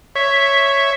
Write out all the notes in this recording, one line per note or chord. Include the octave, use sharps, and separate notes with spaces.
C#5 E5